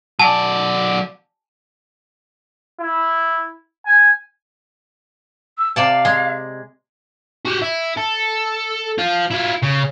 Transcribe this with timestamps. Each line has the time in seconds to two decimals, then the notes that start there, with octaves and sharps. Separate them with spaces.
0.19 F#3 D5 G#5 A5
2.80 E4
3.86 G#5
5.58 E6
5.76 C3 D5 F5 A5
6.05 G#3
7.45 F#4 G4
7.62 E4
7.97 A4
8.98 F3 F4
9.31 E4 F4
9.63 C#3